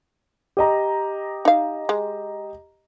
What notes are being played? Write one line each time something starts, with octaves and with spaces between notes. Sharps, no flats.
G4 D#5 A#5
D#4 F5
G#3